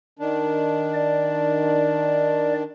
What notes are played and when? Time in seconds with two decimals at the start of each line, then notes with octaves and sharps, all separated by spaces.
0.19 D#3 D4
0.94 D5